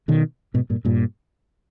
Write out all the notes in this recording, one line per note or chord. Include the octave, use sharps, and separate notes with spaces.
B2 D#3
G#2 B2
G2 A#2
G2 A#2